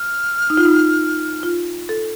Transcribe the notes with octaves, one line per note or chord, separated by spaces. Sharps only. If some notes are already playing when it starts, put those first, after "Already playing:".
Already playing: F6
D#4
F4
D#4
F4
A4